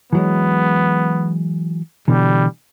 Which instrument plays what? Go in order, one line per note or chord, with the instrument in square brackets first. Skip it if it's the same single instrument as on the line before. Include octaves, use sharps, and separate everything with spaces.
[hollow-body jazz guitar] E3 F#3 G#3 [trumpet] B3
[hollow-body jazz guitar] B2 D3 E3 [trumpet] G3